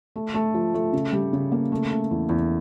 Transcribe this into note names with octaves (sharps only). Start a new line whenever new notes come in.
A3
A3
F3
A3
C#3
G3
C#3
A#3
A3
A3
E2
E2